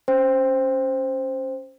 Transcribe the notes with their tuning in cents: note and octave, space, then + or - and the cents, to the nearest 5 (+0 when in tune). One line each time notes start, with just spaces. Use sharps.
C#4 +0 C5 +5 G5 +15